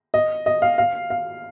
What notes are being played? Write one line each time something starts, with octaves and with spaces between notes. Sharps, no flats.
D#5
D#5
F5
F5
F5